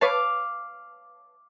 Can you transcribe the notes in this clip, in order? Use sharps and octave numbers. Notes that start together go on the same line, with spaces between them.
B4 C#5 F5 A5 D6